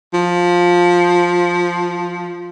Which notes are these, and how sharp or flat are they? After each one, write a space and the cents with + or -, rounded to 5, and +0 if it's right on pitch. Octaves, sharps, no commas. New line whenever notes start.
F3 +10